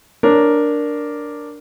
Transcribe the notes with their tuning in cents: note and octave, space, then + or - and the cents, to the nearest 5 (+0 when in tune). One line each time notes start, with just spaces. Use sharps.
D4 +0 A#4 +0 C#5 +0